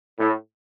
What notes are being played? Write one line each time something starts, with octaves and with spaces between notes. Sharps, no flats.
A2